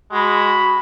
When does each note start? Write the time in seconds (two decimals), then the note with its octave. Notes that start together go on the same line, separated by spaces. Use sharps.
0.12 G#3 F#4 B5